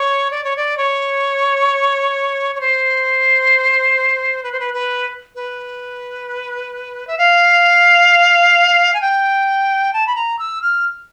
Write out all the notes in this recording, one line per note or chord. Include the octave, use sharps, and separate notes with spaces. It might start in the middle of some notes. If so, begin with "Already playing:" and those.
Already playing: C#5
D5
C#5
D5
C#5
C#5
C5
B4
C5
B4
B4
B4
E5
F5
G#5
G5
A5
B5
A#5
E6
F6